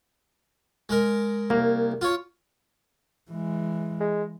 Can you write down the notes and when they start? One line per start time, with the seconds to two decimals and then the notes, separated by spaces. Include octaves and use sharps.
0.89 G#3 A#4
1.50 C2 A#3
2.01 F4 C#5
3.32 E3 G#3
4.01 G#3